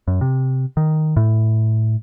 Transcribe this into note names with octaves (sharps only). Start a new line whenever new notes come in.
F#2
C3
D#3
A2